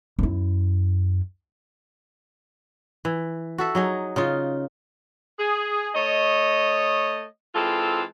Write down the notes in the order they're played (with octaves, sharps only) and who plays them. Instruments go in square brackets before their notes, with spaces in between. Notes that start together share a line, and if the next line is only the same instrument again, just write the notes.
[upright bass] F#2 E4
[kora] E3
F#4 A4 E5
F#3 D#4 G#4
C#3 D#4 F4
[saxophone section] G#4
A3 C#5 D#5
E3 G#3 C4 F4 A4